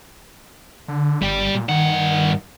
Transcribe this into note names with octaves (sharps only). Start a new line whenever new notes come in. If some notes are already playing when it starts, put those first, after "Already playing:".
D3
G1 G3 G4
A#2
G2 D#3 F#5